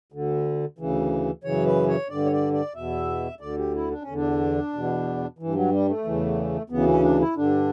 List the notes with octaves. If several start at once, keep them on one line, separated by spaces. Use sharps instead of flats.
D2 D3
D2 C#3 E3
F#2 C#3 E3 C#5
B4
C#5
G2 D3 D5
C#5
D5
D5
E2 B2 E5
D2 D3 D5
G4
E4
D4
C#4
E2 D3
D4
E2 B2
G2 E3
F#3
G3
A3
E2 C#3 E3
D2 C#3 E3 B3
C#4
D4
E4
G2 D3 D4